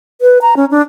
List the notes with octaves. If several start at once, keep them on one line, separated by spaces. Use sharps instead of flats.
B4
A#5
C#4
D4